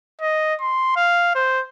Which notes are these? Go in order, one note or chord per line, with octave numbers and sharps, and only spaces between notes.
D#5
C6
F5
C5